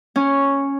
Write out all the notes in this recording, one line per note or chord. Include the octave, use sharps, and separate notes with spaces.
C#4